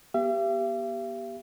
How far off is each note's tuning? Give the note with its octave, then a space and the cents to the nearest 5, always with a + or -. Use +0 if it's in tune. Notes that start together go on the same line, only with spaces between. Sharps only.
B3 -40 G4 +0 E5 +45